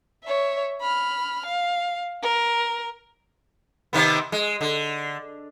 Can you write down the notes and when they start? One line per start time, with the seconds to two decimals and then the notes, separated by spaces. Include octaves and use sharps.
0.24 C#5 E5
0.81 B5 F6
1.46 F5
2.23 A#4
3.93 C3 D#3 B3
4.32 G#3
4.61 D3